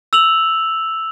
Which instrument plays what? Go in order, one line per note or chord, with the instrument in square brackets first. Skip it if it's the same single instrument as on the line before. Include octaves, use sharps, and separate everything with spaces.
[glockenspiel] E6 F7 F#7